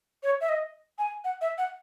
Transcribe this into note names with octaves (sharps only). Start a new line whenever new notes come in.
C#5
E5
D#5
G#5
F#5
E5
F#5